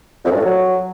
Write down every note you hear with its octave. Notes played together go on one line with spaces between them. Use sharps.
F2
F#2
G2
A2
F#3